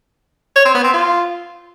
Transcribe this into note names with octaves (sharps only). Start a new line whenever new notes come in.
C#5
C4
B3
C4
F4